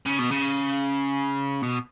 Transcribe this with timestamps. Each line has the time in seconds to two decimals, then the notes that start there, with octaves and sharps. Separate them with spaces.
0.06 C#3
0.19 B2
0.31 C#3
1.62 B2